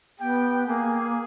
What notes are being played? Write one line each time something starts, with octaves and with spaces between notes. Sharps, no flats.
B3 G4 G5
A#3 G#4 G#5